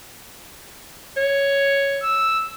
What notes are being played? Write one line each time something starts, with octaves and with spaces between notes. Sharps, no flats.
C#5
E6